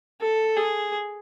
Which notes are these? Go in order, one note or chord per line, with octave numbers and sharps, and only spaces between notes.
A4
G#4